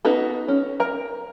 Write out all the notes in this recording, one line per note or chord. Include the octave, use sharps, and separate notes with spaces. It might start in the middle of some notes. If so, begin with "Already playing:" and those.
B3 D#4 F#4 A4
C#4
A#4 A#5